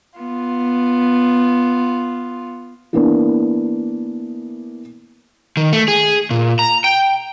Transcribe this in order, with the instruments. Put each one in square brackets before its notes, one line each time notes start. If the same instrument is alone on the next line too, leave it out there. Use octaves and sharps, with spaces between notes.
[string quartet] B3 F4
[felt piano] E3 A#3 B3 D4
[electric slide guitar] D#3
A3
G#4
A#2
A#5
G5